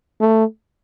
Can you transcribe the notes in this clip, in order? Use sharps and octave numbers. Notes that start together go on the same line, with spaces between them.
A3